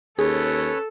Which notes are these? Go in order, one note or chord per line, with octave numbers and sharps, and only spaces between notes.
D#2 C#4 G#4 A4 B4 C#5